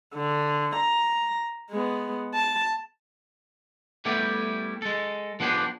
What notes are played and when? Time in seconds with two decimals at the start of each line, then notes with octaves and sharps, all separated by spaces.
0.15 D3
0.76 A#5
1.70 G#3 B3
2.34 A5
4.05 G3 A3 B3 E4 G4
4.82 G#3 A4
5.40 F3 B3 D4 G4 G#4